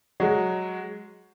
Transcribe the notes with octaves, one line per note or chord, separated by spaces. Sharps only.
F#3 G#3